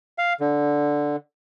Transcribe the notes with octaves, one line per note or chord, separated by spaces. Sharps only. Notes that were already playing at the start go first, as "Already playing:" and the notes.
F5
D3